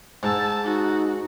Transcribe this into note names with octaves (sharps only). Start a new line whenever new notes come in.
G#2 A5 E6
D#4 F#4